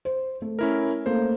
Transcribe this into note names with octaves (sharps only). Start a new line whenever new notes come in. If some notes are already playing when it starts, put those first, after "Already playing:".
C5
A3
C#4 E4 A#4
A3 A#3 A4 C5